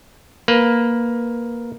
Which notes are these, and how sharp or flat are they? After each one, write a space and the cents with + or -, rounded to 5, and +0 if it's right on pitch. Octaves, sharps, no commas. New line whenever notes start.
A#3 +5 B4 +0